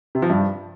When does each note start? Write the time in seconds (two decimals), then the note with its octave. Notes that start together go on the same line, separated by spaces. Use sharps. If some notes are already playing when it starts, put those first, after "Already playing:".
0.15 C3
0.22 F3
0.30 G2